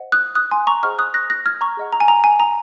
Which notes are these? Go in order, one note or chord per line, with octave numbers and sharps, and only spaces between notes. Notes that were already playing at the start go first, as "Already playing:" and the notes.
Already playing: C5 D#5 F#5
D#6 F#6
D#6 F#6
G#5 C6
A#5 C#6
G#4 C5 D#5 F#5 C#6 F6
D#6 F#6
F#6 A#6
F#6 A#6
F6 G#6
A#5 C#6
G#4 D#5 F#5
A#5
G#5
A#5
G#5
A#5